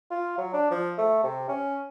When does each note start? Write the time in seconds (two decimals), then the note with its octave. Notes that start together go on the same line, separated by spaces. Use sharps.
0.11 F4
0.38 F#3
0.53 D4
0.71 F3
0.98 A3
1.24 C3
1.49 C#4